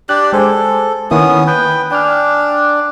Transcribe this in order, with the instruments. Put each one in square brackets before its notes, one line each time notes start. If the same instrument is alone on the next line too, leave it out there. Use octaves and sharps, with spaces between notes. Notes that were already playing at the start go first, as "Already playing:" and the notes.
[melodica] D4 G4 D5 [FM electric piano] F#6
[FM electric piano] G#3 C5 G#5 [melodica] A4
[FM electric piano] D#3 A#3 E4 [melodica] B3 C#4 D#6
[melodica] B4 G5
[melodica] D4 [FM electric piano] G5 G#5 F6